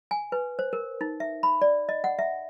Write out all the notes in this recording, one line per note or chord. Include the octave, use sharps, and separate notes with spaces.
G#5
B4
C5
A#4
D#4
E5
B5
D5
D#5
F#5
E5